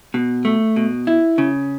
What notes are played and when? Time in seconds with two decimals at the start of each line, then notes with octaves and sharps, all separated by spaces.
0.14 B2
0.45 A3
0.76 B2
1.07 E4
1.38 C#3